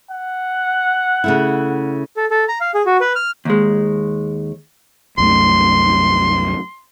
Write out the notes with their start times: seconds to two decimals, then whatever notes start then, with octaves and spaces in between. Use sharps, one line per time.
0.11 F#5
1.24 C#3 A3 E4
2.17 A4
2.30 A4
2.48 A#5
2.61 F5
2.74 G#4
2.86 F#4
3.01 B4
3.15 F6
3.45 D#2 G#3
5.18 C2 F#2 A3 C6